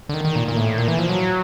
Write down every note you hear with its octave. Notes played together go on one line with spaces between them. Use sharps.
D3
D#3
D#3
A#2
A#2
A2
A#2
E3
F3
F#3